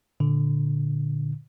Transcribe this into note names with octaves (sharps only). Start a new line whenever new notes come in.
A#2 D3